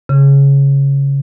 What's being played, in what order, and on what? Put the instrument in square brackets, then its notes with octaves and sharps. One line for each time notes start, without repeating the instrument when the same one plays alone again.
[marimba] C#3